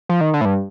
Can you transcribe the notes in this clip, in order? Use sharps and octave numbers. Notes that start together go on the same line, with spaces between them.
F3
D#3
D3
A2
G2